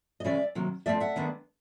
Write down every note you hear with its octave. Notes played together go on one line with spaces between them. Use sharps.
D#5
C#3 E3 G#3 C#4 D5 E5
C3 D#3 F#3 A#3
F3 A3 C4 D5 E5
E5 F#5
D#3 G#3 B3 D4